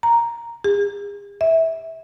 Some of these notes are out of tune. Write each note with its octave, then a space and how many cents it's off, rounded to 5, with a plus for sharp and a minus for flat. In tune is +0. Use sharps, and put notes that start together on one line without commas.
A#5 +0
G#4 -40
E5 -20